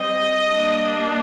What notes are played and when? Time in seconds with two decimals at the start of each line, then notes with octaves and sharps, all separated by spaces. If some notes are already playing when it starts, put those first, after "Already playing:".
Already playing: G3 C4 D#5
0.51 G3 A#3 D4